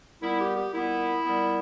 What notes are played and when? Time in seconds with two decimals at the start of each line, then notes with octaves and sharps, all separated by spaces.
0.22 A#2 G3 B3 E4
0.40 G4
0.56 G4
0.73 A#2 G3 B3 E4
1.25 A#2 G3 B3